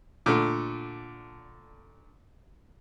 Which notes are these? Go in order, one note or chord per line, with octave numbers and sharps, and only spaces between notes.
A#2 D3 A3